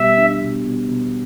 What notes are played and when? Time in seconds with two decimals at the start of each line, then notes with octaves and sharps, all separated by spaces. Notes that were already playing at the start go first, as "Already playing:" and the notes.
Already playing: B2 G3 E5
0.17 D4
0.41 B2
0.65 B2
0.88 B2